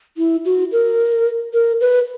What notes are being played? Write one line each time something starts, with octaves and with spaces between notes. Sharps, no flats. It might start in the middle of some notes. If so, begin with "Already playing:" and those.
E4
F#4
A#4
A#4
B4